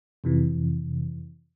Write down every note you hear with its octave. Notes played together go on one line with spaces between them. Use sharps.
F2 C3 E3